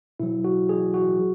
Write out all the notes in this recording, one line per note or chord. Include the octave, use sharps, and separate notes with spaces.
B2 F#3 E4
F#4
G#4
F#4
F#3